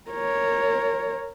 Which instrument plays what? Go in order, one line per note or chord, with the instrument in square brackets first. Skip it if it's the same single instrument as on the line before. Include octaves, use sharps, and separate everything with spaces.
[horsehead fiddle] A#4 C#5